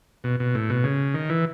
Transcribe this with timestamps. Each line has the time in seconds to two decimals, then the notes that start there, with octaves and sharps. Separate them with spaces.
0.24 B2
0.40 B2
0.55 A2
0.70 B2
0.84 C#3
1.14 D#3
1.29 E3